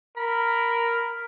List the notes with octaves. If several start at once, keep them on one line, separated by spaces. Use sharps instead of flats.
A#4 B5